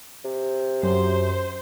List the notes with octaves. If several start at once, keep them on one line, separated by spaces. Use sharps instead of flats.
C3
F#2 C5